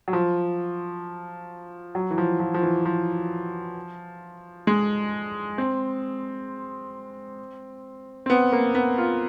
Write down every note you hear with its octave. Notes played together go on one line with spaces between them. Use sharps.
F#3
F3
F#3
E3
F3
F3
F3
E3
F3
G#3
C4
C4
B3
A#3
B3
F4